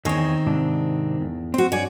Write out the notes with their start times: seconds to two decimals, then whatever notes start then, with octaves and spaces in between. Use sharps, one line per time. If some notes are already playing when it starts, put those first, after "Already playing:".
0.05 E2 D#3 C4 G#4 C#5
0.47 G#2 C3 D4
1.21 E2
1.54 C4 F#4 C5
1.72 G2 C#5 D5 G#5